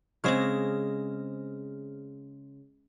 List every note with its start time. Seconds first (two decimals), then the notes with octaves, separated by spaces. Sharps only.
0.24 C#3 G#3 C4 C5 C#5 F6